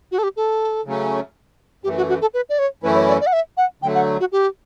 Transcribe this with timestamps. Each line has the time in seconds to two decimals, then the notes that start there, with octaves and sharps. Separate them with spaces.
0.12 F#4
0.18 A4
0.23 G4
0.36 A4
0.85 C#3 F#3 A3 C#4
1.84 F#2 E3 A3 G4
1.97 F#4
2.09 F#4
2.21 A4
2.34 B4
2.49 D5
2.59 C#5
2.83 F#2 E3 A3 C#4 E4 B4
2.95 C#5
3.08 D5
3.21 D5
3.27 F#5
3.33 E5
3.57 F#5
3.82 D3 F#3 A3 G5
3.94 F#5
4.20 F#4
4.32 G4